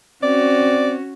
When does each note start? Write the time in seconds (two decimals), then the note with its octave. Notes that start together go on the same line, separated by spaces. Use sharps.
0.23 C4 C#4 F#4 D5